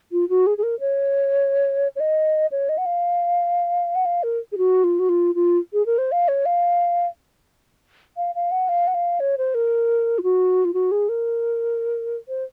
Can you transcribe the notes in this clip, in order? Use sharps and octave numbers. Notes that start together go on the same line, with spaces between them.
F4
F#4
G#4
G#4
A#4
C#5
C#5
D#5
C#5
D#5
F#5
F5
F#5
F5
A#4
G#4
F#4
F4
F#4
F4
F4
G#4
A#4
C5
F5
C#5
F5
F5
F5
F#5
F5
F#5
F5
C#5
C5
A#4
F4
F#4
F4
F#4
G#4
A#4
C5